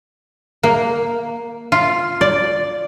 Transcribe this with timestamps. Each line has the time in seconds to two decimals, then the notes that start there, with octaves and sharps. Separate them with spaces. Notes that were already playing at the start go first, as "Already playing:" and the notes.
0.63 A#3
1.72 F4
2.21 D5